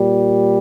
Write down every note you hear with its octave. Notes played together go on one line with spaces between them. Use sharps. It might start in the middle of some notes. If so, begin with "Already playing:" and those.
Already playing: A#2 G3